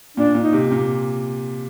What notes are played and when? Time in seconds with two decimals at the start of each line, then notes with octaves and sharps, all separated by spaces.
0.17 A#2 D4
0.35 A#2
0.41 D#4
0.53 C3
0.72 A#2